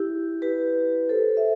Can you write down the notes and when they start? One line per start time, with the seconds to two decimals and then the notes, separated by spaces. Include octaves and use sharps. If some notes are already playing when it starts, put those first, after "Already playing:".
Already playing: E4 G4
0.42 G4 B4
1.09 A4 C5
1.37 E5